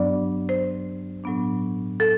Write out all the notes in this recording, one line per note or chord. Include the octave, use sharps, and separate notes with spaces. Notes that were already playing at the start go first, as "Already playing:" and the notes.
Already playing: G2 F#3 B3 D4 D5
C5
A2 F#3 B3 D4
A4